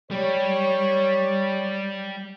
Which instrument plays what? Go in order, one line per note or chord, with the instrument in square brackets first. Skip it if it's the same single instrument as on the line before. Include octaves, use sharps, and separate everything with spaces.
[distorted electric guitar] G3 [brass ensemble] C#5